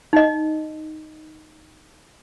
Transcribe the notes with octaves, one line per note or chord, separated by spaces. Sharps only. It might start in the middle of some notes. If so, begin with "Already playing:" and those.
D#4 D#5